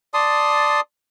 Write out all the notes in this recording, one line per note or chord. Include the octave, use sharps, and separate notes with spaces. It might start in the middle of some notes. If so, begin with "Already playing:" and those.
D5 A5 C6 D#6